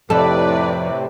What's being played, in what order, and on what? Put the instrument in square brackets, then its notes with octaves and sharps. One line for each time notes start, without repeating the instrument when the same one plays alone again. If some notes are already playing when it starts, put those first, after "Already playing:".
[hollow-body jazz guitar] F2 [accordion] A2 C3 [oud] A4 [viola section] B4 D5